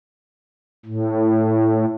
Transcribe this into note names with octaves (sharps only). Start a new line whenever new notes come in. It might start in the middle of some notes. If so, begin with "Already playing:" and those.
A2